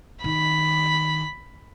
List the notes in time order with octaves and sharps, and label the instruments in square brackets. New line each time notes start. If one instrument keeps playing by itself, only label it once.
[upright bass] D#3 [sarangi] B5